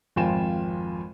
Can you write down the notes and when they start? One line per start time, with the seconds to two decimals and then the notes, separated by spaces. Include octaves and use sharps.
0.16 G#1 F2 F4 G5 G#5 E7